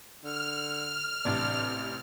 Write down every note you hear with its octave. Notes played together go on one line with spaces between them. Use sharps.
D3 F6
A1 C3 D4